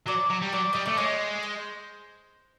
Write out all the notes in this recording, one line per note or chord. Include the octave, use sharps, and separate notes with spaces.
F#3 D5
F#3
G3
F#3 D5
G3 D#5
A3 D5
G#3 C#5
C5